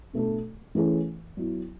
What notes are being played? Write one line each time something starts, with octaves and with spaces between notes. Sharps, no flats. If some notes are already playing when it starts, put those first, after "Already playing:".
B2 A3 D4 A4
E3 A3 C#4 G#4
F#3 B3 E4